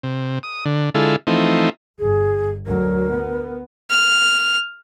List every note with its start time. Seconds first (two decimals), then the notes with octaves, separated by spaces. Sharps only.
0.03 C3
0.43 D#6
0.65 D3
0.95 D3 G#3 E4 F4 A4
1.27 E3 F3 A3 C4 D#4
1.99 G1 G#4
2.66 D2 F#3 A#4
3.11 B3
3.90 F6